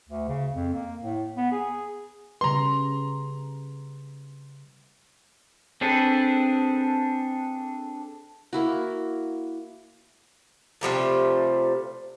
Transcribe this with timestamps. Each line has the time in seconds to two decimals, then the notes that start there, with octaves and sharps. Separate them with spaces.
0.09 D2
0.28 C#3
0.53 F2
0.74 A#3
1.01 A2
1.37 B3
1.52 G#4
2.41 C#3 G3 B4 A#5 C6
5.81 C4 D4 G#4 A4 B4
8.53 A#3 E4 F#4
10.81 C3 F3 G3 A3